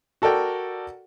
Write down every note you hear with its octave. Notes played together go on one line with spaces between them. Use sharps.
F#4 A4 A#4 D5 G5